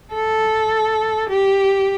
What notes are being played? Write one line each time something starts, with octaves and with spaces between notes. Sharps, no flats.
A4
G4